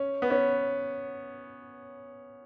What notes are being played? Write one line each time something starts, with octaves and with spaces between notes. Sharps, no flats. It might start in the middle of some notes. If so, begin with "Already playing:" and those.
Already playing: C#4
B3
C#4